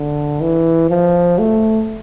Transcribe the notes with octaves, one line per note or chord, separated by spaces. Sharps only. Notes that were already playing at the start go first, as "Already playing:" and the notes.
Already playing: D3
E3
F3
A3